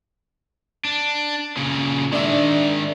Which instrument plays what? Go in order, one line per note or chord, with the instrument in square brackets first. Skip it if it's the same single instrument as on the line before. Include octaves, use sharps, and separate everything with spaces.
[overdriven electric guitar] D4
A#2 C#3
[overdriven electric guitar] D#3 G#3 [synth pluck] D4 D5 E5